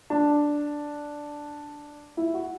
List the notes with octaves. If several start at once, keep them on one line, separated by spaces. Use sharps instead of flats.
D4
E4
F#4